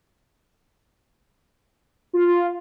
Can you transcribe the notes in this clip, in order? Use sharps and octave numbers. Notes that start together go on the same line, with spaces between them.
F4